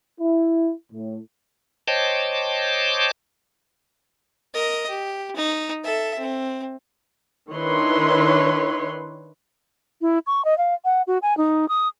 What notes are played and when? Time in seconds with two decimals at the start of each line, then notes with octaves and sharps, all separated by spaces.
0.21 E4
0.93 A2
1.88 C5 C#5 D#5 G5 A5 D6
4.54 A#4 D#5
4.89 G4
5.35 D#4
5.84 A4 E5
6.19 C4
7.50 D#3 D4 E4 B4 C#5 C6
10.01 E4
10.27 C#6
10.45 D#5
10.58 F5
10.85 F#5
11.07 F#4
11.22 G#5
11.37 D#4
11.69 D#6